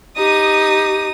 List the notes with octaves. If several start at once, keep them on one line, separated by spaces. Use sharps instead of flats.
D#4 G4 D#6